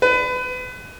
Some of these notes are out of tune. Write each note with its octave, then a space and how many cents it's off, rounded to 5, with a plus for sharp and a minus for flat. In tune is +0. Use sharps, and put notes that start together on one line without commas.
B4 +30